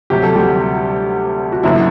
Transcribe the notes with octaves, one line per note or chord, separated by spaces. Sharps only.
D2 C3 F#3 G4
A4
G3 G4
F#4
F#1 F#2 D3 F#3 B3 E4